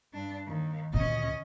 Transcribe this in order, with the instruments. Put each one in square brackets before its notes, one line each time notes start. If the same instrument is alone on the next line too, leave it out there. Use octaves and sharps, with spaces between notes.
[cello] G2 D4
D#2
[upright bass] D2 A#2 [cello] C#4 D#5